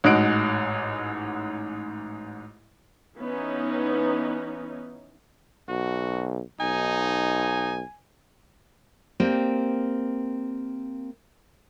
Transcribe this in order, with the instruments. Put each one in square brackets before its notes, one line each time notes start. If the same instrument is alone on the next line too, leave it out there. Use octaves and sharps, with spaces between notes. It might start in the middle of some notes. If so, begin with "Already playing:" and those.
[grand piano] A1 G#2 F#4 D#5 F#6 D7
[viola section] E3 B3 C#4 D#4
[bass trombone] B1 [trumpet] F#4
[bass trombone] B1 [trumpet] D#4 [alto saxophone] G#5
[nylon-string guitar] A#3 C4 G4 D5